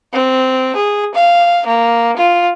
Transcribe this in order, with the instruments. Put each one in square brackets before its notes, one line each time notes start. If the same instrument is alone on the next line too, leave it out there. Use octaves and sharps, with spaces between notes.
[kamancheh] C4
G#4
F5
A#3
F4